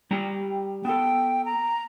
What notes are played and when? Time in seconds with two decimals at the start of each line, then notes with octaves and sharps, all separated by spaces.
0.11 G3 G4 A#5
0.85 B3 A4 G5
1.45 A#5